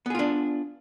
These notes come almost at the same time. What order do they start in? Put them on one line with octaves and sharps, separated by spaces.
B3 G#4 F4 D4